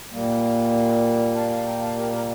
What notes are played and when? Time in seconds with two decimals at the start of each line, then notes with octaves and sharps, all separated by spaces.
0.12 A#2 G3 A#3
1.34 F5 A5
1.50 F5 A5
1.66 G5 A#5
1.81 F5 A5
1.97 G4 A#4
2.12 G4 A#4